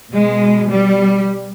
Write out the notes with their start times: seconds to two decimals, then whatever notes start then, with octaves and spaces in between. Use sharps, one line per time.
0.11 B2 G#3
0.69 G3